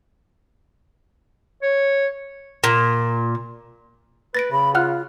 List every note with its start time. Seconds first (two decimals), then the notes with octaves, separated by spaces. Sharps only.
1.62 C#5
2.64 A#2
4.35 B4 A6 A#6 D7
4.51 C#3 B5
4.75 F4 F#5 F6 F#6